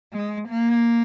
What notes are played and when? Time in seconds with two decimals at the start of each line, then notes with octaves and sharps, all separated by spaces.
0.12 G#3
0.49 A#3